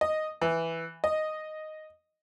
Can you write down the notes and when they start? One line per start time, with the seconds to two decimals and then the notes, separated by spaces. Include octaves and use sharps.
0.01 D#5
0.42 E3
1.04 D#5